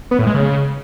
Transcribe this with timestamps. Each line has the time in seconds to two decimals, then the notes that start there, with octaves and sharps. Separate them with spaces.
0.11 B3
0.19 A2
0.27 G#3
0.34 C#3